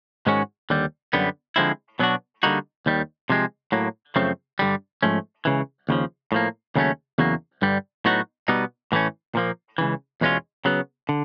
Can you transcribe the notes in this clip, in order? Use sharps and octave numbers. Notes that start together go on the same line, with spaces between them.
G#2 D#3 G#3 C#4 F#4
D#2 D3 G3
F#2 D3 G3 B3
D3 F3 G#3 C4 E4
B2 F#3 B3 D4 F#4
D3 G3 A#3 D#4 F#4
D#2 D#3 G3
C3 F3 G#3 C4
A2 F#3 A#3
F#2 C#3 F3 A3 C4
G2 D3 G3
G#2 F3 A3 C#4
C#2 C#3 E3
D#2 C#3 F3
A2 F3 A#3
D#2 C#3 F#3 A3 C#4
E2 C#3 F#3 A#3
G2 D3 G3
A2 F#3 B3 D#4 F#4
B2 G3 B3 D#4
A2 E3 A3 C#4
A#2 F3 A#3
C#2 C#3 E3
E2 B2 G#3 C#4 F4
C#3 F#3 B3
D3